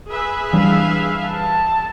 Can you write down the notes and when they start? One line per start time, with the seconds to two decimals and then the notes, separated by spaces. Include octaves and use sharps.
0.10 G#4 B4 E5
0.53 E3 G3 D4 F5
1.27 A5